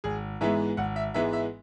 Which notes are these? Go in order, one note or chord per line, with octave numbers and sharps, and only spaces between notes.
G#1 G#4
G#2 E3 G#3 B3 E5
G#1 F#5
E5
G#2 E3 G#3 B3 E5
E5